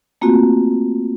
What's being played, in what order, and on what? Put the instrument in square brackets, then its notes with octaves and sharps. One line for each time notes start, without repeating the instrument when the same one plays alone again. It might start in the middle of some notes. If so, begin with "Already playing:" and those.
[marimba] A3 A#3 C4 F4 F#4